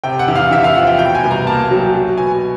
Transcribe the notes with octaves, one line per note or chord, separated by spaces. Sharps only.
C3 G5
F#5
E2
F5
E2 E5
F5
F3 F#5
G5
B2 G5
G#5
C2
A#5
A#3 A5
F#3
F#3
B2 G#5